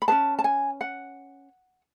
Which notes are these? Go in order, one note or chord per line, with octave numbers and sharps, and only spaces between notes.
B5
C#4 G#4 B4 A5
A5
G#5
F#5